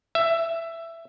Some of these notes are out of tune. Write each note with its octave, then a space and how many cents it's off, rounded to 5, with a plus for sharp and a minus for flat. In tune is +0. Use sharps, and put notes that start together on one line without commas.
E5 +15